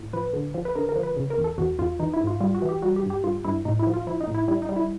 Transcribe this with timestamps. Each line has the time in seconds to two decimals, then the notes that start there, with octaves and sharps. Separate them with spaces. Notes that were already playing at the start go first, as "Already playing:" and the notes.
Already playing: A2
0.13 F3 B4
0.33 D3
0.54 F3
0.65 B4
0.75 D3 A#4
0.89 A#4
0.96 F3
1.03 B4
1.17 C#3
1.30 A#4
1.37 E2
1.44 A4
1.58 E2 F#4
1.79 E2 F4
1.99 E3 D#4
2.13 E4
2.20 G#2
2.27 F4
2.40 G3 F4
2.54 F#4
2.62 E3
2.69 G4
2.82 G3 F#4
2.96 G4
3.03 G2
3.10 G4
3.24 G2 F4
3.44 G2 E4
3.65 A2 D#4
3.79 E4
3.87 F3
3.93 F4
4.07 F3 E4
4.21 D#4
4.27 A2
4.34 E4
4.48 G3 E4
4.62 D#4
4.69 G3
4.76 E4